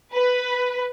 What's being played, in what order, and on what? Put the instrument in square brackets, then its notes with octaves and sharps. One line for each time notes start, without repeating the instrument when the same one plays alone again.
[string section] B4